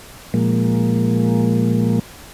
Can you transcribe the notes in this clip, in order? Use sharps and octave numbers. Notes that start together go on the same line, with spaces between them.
A#2 F3 G#3 A#3